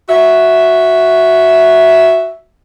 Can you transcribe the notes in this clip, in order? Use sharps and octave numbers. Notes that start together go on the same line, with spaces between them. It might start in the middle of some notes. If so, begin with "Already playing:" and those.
F#4 E5